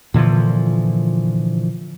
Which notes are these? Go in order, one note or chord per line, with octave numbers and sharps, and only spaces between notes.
A#2 D3 E3 F3